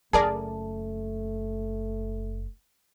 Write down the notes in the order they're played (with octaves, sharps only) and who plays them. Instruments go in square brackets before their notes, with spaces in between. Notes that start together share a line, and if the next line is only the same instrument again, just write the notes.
[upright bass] F#1 [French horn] A3 [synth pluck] G#4 A#4 D5 [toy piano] A5